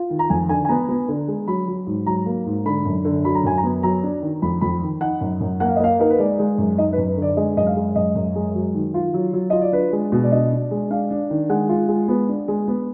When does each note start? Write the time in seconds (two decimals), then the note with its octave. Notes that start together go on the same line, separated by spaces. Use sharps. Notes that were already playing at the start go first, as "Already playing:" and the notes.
Already playing: F4
0.10 D#3
0.19 A#5
0.30 F2 G#5
0.49 D3 G#5
0.65 G#5
0.69 B3 A#5
0.89 B3
1.08 D3
1.28 G#3
1.47 F#3 B5
1.68 F#3
1.87 G#2
2.06 F#3 A#5
2.26 A#3
2.46 G#2
2.65 D3 B5
2.85 F#2
3.05 D3
3.25 F#3 B5
3.35 A#5
3.44 F#2 G#5
3.58 A#5
3.63 B3
3.83 F#3 A#5
4.03 D4
4.22 D#3
4.42 F2 B5
4.61 F2 B5
4.82 D#3
5.01 D#4 F#5
5.21 F#2
5.41 F#2
5.60 A#3 F#5
5.69 F5
5.76 D#5
5.80 A#3 F5
5.99 D#4 A#4
6.10 B4
6.19 G#3 D5
6.39 G#3
6.58 F#2
6.78 D#4 D#5
6.93 B4
6.98 F#2
7.08 B4
7.17 D3
7.22 D5
7.37 G#3 D#5
7.57 F#2 D#5
7.67 F5
7.76 G#3
7.96 F#2 D#5
8.15 F#2
8.36 G#3
8.55 F#3
8.74 D#3
8.94 F4
9.14 F#3
9.33 F#3
9.50 F4 D#5
9.62 D5
9.72 D4 B4
9.92 G#3
10.12 B2
10.23 D5
10.32 D4 D#5
10.52 D4
10.71 G#3
10.90 D4 F5
11.10 D4
11.30 D#3
11.49 G#3 F#5
11.69 F4
11.89 G#3
12.08 B3
12.28 D4
12.48 G#3
12.68 B3